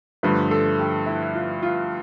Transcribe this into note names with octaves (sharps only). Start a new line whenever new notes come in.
G2 D3 F3 A3 B4
A4
G4
E4
F4
F4